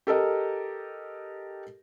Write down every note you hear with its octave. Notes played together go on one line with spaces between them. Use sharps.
G4 A4 A#4 D#5